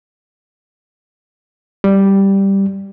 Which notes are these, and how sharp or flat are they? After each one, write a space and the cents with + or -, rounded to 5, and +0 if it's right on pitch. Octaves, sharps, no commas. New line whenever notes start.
G3 +0